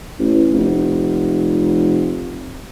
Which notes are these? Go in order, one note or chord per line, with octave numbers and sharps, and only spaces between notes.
A1
F1